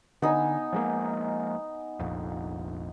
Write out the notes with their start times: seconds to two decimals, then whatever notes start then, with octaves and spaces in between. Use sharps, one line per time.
0.22 D3 B3 D#4 G#5
0.73 F3 G#3 A#3
1.99 F1 A#1 F2